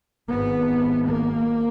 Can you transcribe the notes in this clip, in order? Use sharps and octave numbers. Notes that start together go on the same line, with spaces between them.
G#1 G#2 B3
A#3